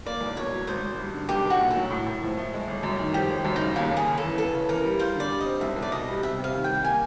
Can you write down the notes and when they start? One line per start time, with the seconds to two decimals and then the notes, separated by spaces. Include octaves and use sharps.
0.06 A#3 D5
0.21 B1
0.36 B2 C#5
0.53 F#3
0.67 G#1 C5
0.82 G#1
0.98 G2
1.14 D3
1.29 B1 G4
1.45 B1 F#4
1.60 A#2
1.70 F#3 A4
1.90 A2
2.06 A2
2.22 F3
2.37 A3
2.53 G#3
2.68 G1
2.83 F#2
2.99 D#3
3.14 F3 G4
3.29 G1
3.45 F#2
3.56 D#4
3.61 C#3
3.76 D#2 F4
3.92 D#2
3.97 G#4
4.06 C#3
4.18 A4
4.23 E3
4.38 B3 A4
4.53 C#3
4.69 E3 A#4
4.84 G3
4.99 F4 C5
5.16 D3 D5
5.31 G3
5.41 C4 D#5
5.61 B1 E5
5.76 B1
5.82 D5
5.92 B2 D#5
6.08 G3
6.23 C3 E5
6.38 C3
6.44 F5
6.54 D#3
6.64 G5
6.69 G3
6.84 A#3 G#5